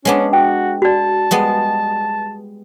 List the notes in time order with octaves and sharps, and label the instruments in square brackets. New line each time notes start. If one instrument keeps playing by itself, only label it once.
[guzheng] G#3 B3 D4 [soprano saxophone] C#4
[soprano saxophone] F#4 [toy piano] G5
[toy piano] F#4 D5 [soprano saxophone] A5
[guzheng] G3 G#3 B3